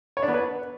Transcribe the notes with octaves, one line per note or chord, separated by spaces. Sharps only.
C#5
D4
B3
B4